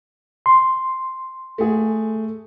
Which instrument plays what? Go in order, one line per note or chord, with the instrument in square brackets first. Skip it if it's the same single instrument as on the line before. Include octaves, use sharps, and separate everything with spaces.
[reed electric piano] C6
[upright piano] A3 G#4